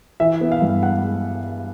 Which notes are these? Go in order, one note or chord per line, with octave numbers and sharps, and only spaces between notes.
E3 E5
B3
F5
G2
G#3 F#5
G#3